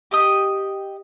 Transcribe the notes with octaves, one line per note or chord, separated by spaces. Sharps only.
G4 D#5 D#6